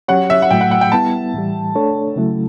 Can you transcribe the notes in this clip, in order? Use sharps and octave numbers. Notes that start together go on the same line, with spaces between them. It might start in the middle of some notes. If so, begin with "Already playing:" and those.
F#3 C#4 G4 C#5 F#5
E5
F#5
A2 F#3 A3 G5
F#5
F#5
G5
G3 B3 E4 A5
A2 E3 G3
A3 D4 A4 C#5
C#3 F#3 A3 E4